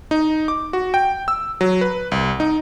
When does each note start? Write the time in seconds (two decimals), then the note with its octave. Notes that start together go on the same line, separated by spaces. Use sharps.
0.11 D#4
0.48 D6
0.73 F#4
0.94 G5
1.28 E6
1.61 F#3
1.81 B4
2.12 C2
2.40 D#4